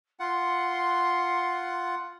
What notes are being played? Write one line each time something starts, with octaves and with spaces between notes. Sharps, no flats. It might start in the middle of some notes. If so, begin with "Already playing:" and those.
F4 F#5 C6